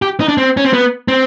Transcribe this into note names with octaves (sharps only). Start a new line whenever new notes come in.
G4
D#4
D4
C4
C#4
C4
B3
C4